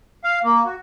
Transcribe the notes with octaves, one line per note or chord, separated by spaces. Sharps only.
F5
A#3
F#4